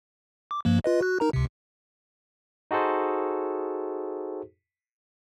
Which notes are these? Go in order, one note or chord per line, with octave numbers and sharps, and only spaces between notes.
D6
G2 F3 A#3
F4 B4 D#5
F#4 F#6
D#4 A#4 A#5
C#2 C3
D#4 F#4 G#4 A4 C5